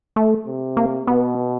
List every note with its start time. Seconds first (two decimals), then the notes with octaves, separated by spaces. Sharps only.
0.16 A3
0.47 C3
0.77 A#3
1.07 B2 B3